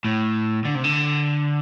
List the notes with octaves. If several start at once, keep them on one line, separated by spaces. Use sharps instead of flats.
A2
D3
C3
D3